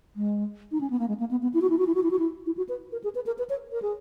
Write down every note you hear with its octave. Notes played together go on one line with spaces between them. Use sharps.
G#3
D#4
C#4
B3
A#3
G#3
A#3
B3
B3
E4
F#4
E4
F#4
E4
F#4
E4
F#4
E4
E4
F#4
B4
A#4
G#4
B4
A#4
B4
C#5
A#4
G#4